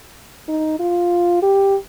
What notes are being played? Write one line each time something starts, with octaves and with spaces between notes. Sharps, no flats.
D#4
F4
G4